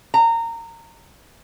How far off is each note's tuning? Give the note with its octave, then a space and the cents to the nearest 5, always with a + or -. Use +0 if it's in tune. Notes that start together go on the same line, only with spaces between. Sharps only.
A#5 -20